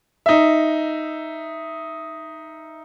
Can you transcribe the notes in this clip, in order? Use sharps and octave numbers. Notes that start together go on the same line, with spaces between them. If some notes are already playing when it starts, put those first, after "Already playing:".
D#4 E5